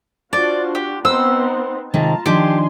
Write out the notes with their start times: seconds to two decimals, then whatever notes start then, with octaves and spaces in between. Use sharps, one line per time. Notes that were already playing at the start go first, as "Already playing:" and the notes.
0.33 D4 F4 F#4 C5 D5
0.75 G4
1.05 B3 C4 D#4 C5 E6
1.94 C3 D#3 G#3 F4 A5 A#5
2.26 D#3 F3 D4 G4 G#5 C6